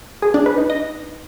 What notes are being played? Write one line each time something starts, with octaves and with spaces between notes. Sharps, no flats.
G#4
D4
B4
D#4
D#5